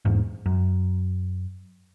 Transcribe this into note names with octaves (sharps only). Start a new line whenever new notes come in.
E2 G#2
F#2